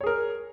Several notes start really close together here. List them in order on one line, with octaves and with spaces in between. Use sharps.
C#5 G#4 A#4